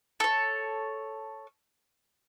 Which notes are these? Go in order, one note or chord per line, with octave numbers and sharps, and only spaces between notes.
A4 C#5